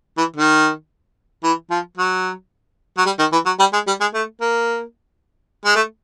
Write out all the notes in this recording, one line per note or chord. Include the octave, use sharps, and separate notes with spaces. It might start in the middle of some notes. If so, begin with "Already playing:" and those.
E3
D#3
E3
F3
F#3
F#3
G3
D#3
E3
F#3
G3
G#3
G3
G#3
A3
A#3
G#3
A3